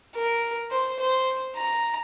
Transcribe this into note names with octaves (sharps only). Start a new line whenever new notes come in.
A#4
C5
C5
A#5